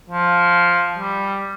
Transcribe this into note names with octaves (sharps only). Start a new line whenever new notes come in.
F3
G3